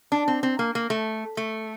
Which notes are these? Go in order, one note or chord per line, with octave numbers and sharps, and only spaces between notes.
D4
C4
C4
A#3
A#3
A3
A3